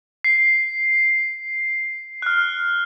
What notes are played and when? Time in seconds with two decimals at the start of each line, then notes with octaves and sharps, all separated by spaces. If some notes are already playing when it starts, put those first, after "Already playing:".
0.24 C7
2.22 F6 F#6